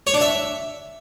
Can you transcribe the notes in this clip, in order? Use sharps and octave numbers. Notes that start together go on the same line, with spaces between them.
C#5
D4
E5